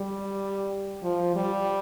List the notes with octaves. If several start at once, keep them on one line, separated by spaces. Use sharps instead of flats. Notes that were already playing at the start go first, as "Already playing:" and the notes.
Already playing: G3
F3
G3